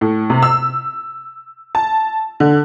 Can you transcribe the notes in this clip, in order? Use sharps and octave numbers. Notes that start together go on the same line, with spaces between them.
A2
C3
E6
A5
D3